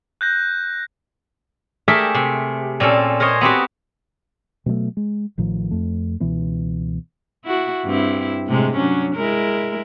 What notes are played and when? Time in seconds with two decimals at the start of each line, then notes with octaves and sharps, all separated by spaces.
0.21 F#6 G6 A#6
1.88 A3 G4 G#4 A#4 E5 G5
2.15 C3
2.80 A#2 C4 C#4 A4
3.20 A#4 C5 C#5 D#5 G#5
3.41 B3 C4 F#4 G4
4.66 B2 F#3 G#3 A3
4.97 G#3
5.38 A1 A2 D#3 F3
5.71 F2 A3
6.20 C#2 B2 E3 B3
7.44 E4 F#4
7.86 G2 C4 E4
8.47 A2 C3 G#3
8.77 F#3 C#4 D4
9.15 G#3 E4 A#4